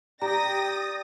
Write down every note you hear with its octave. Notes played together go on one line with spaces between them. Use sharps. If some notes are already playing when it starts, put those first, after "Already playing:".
G4 D5 G5 A#5 D#6 A#6